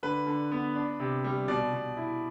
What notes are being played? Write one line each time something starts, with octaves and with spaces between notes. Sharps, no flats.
D3 B4
D3
B3
D4
C3
G3
B2 D5
B2
E4